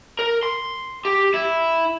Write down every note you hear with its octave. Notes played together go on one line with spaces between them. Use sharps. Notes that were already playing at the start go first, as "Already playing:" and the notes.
A#4
C6
G4
E4